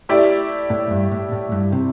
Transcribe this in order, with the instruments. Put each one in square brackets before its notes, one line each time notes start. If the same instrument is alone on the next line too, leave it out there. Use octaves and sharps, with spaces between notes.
[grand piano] A3 E4 G4 D5
[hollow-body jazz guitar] A2
G2
A2
A2
G2
C3